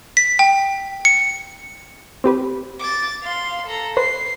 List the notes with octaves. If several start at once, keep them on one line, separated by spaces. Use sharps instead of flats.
B6
G5
C#7
C4 G4 B4
D6 A6
F5 C6
A4 A#5
B4 C5 C7